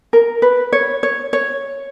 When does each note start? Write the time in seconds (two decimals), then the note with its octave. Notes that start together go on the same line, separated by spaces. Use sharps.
0.13 A#4
0.42 B4
0.73 C#5
1.03 C#5
1.33 C#5